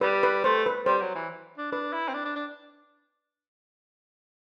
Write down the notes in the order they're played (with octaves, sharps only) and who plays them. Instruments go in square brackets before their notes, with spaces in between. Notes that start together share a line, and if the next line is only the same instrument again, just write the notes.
[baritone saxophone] G3 [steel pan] B4
[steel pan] B4
[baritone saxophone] A3 [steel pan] C5
[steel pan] B4
[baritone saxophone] G3 [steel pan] C5
[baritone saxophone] F#3
E3
D4
[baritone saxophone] D4 [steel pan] B4
[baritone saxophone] E4
C4
D4
D4
D4